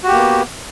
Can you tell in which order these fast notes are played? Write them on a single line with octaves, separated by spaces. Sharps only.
F#4 G4 A#3 B3